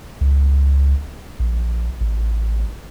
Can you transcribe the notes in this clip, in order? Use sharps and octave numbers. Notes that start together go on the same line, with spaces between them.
C#2
A#1
A1